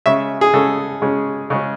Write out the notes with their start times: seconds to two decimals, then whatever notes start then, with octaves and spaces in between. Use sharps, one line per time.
0.06 C#3 G#3 C#4 E5
0.41 G#4
0.53 C#3 G#3 C#4 A4
1.02 C#3 G#3 C#4
1.50 C#3 G#3 C#4